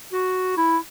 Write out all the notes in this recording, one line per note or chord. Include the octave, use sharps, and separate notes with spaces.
F#4
E4